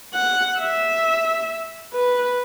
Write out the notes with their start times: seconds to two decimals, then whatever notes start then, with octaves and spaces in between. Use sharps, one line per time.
0.14 F#5
0.58 E5
1.93 B4